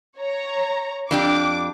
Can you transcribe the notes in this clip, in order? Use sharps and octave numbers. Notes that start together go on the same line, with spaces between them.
C#5 A#5
F2 D4 G4 D6